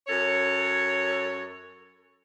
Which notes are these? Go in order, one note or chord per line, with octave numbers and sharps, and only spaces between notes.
F#2 A4 C#5